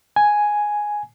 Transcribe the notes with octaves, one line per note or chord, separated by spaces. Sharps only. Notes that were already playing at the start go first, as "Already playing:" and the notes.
G#5